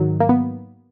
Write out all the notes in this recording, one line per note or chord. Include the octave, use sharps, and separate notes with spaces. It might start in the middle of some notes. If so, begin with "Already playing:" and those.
Already playing: G#2 D#3 F#3
A#3
B3